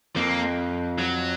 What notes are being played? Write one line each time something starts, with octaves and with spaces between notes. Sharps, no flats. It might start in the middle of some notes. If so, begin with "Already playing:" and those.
F2 A#3
F#3